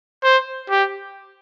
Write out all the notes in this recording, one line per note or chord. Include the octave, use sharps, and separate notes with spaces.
C5
G4